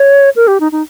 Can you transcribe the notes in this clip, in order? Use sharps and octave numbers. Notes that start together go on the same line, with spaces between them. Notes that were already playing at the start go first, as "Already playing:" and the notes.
Already playing: C#5
A#4
G4
D#4
D#4